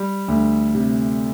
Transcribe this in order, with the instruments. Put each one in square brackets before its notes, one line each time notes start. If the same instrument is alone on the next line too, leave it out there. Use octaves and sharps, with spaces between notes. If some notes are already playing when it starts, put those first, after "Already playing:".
Already playing: [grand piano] G3
D2
C3